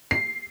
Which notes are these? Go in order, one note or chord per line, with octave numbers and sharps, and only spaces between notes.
C7